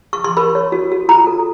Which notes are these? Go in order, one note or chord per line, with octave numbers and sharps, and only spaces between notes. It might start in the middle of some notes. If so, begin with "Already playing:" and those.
C#6
C6
A#4 B5
C#5
F#4
F#4
F4 A#5
A4